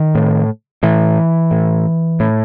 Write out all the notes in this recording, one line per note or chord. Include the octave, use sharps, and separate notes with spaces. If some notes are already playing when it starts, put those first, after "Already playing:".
Already playing: D#3
A2
A2 E3
A2
A2